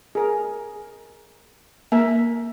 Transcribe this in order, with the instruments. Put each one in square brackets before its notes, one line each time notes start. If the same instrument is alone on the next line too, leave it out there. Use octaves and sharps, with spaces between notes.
[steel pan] G#4 A#4
[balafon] A#3 [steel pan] A#4 E5